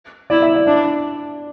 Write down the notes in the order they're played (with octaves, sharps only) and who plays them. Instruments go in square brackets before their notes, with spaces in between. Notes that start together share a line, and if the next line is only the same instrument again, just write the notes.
[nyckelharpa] E4 [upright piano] D5
[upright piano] E5
D5
[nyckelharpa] D4 [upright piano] D5